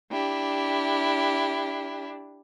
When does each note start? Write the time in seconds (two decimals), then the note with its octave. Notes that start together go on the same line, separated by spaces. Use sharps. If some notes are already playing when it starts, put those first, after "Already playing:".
0.12 D4 E4 G4